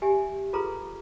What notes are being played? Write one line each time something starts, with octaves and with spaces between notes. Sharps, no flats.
G4 E5 G#5
F4 G#4 A4 B4 A#5 C6